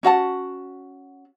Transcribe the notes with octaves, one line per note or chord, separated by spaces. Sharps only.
C#4 F#4 F#5 A5